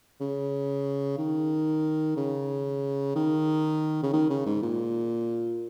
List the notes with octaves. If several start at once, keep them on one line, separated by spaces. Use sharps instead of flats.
C#3
D#3
C#3
D#3
C#3
D#3
C#3
G#2
A#2